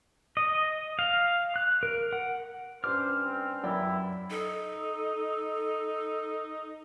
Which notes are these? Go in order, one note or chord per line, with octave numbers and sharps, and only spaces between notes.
D#5
F5
F#6
A#4
F#5
G2 C#4 C5 D6 F6
C4
F#2 E4 D5 G5
D#4 A4